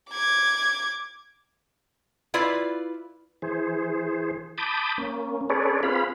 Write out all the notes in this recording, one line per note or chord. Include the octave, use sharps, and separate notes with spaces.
D6 G#6
E4 F4 B4 D5
E3 G#4 C5
A5 B5 D6 D#6 G6
A#3 C#4
C#4 G#4 A4 B4 C#5 D5
C4 F4 G#4 B4 F5 B5